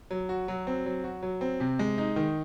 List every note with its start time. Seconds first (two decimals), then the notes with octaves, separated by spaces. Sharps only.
0.11 F#3
0.29 F#4
0.48 F#3
0.67 C4
0.86 F#3
1.04 F#4
1.23 F#3
1.41 C4
1.60 C3
1.79 G#3
1.98 D#4
2.16 D#3